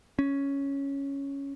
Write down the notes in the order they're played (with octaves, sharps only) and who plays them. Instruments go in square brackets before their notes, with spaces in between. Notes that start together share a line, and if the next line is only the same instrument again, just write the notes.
[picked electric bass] C#4